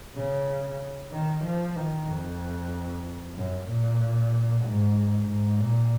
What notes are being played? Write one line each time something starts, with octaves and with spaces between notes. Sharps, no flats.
C#3
D#3
F3
D#3
F2
F#2
A#2
G#2
G#2
A#2